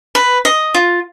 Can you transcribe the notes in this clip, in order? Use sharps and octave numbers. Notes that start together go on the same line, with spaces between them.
B4
D#5
F4